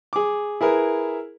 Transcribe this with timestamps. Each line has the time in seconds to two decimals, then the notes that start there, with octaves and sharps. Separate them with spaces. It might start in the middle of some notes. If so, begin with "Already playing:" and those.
0.13 G#4 D6
0.61 E4 G#4 A#4 B4